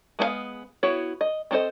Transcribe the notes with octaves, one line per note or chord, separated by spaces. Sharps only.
G#3 B3 G#4 F5
B3 E4 F#4 C#5
D#5
C4 D4 A4 C5 D#5